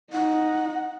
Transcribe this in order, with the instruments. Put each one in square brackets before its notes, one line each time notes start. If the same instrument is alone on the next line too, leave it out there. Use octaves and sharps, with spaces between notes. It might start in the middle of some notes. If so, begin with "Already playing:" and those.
[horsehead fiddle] D#4 [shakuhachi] F#5